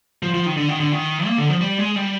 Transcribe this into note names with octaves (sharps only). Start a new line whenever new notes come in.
F3
F3
D#3
D3
D#3
D3
D#3
A#3
D3
F3
G3
G#3
G3